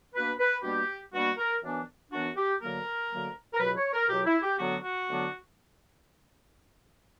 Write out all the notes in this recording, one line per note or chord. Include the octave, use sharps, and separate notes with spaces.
B2 A#3 D4 B4
B4
B2 G3 A#3 D4 G4
B2 G3 A#3 D4 F#4
A#4
F#2 E3 B3 D4
F#2 E3 B3 D4 F#4
G4
D2 D3 F#3 A#3 A#4
D2 D3 F#3 A#3
A#4
C#2 B2 F#3 B4
C#5
A#4
C#2 B2 F#3 G4
E4
G4
D2 D3 F#3 B3 D4 F#4
F#4
D2 D3 F#3 B3 D4